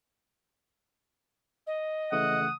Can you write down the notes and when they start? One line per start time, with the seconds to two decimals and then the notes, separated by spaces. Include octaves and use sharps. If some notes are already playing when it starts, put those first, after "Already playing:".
1.66 D#5
2.12 C#3 E3 A3 F#5 D#6